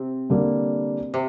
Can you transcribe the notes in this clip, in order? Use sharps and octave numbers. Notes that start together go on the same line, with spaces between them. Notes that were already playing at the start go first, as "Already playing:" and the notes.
Already playing: C3 C4
D3 G3 A#3
C3